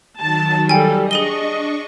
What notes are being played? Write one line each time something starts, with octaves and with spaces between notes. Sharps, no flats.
D#3 F#3 A5
G3 A4 G5 G#5
D4 G#4 D#5 C#6 D#7 G7